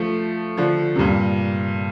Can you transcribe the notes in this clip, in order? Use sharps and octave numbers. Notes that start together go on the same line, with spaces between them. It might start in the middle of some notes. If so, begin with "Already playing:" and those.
Already playing: F3 A3
D3 F3
C3
G2 A#2